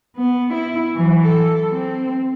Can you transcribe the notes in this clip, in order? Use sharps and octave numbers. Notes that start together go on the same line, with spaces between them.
B3
E4
E3 F#3
A4
C4